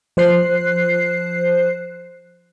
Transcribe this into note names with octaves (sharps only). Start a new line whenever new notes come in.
F3 C5 F#6 C7